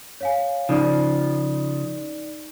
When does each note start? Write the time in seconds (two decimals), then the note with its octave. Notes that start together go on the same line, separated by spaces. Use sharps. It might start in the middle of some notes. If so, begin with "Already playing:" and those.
0.21 C#5 F5 G#5
0.69 C#3 F3 D#4 D5